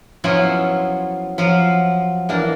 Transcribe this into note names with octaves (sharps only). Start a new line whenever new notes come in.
F3 F#3 B3 C#4 E4 F4
F3 F#3 F4
E3 A#3 D4